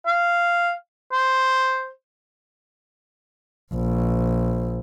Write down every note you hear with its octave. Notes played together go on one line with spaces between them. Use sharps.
F5
C5
A#1